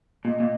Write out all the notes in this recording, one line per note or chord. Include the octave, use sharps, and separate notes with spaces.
A#2 D#5
A#2